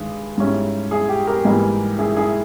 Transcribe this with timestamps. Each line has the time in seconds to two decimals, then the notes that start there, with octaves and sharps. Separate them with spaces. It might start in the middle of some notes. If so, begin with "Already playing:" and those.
Already playing: G2 D#3 G#3 G#4
0.38 G#2 G3 C#4 E4
0.91 E4 G#4
1.09 G4
1.27 G4 A#4
1.45 G#2 E3 G3 A#3 D#4
1.99 E4 G#4
2.16 E4 G#4